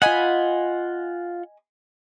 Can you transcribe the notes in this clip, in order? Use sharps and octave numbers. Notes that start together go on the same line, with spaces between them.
F4 D#5 F#5 G#5 B5